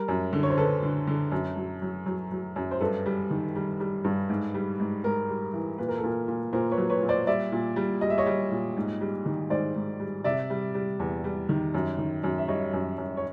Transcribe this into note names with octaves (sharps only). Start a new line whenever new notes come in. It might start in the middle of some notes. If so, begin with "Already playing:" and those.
Already playing: G3 A#4
F#2
D3
C#5
C5
D3 A4 B4
D3
D3
F#2
F#3
F#3
F#3
F#3
F#2
C5
G2 A4 B4
G3
D#3
G3
G3
G2
G#2
G3
G#2
G#2 A#4
G3
E3
A#2 B4
A#4
A4
A#2 A#4
A#2
A#2 A#4 C5
B4 C#5
F#3
B4 C#5
A#2
C5 D5
G3 D5 E5
A#2
G3
G3 D#5
E5
C#5 D#5
G3
A#2
G#2
G3
D#3
G#2 C5 D5
G#2
G3
C3 D5 E5
G3
G3
E2
G3
D#3
F#2
D#3
F#2
E5
G3 C#5 D#5
F#2
F#2
C#5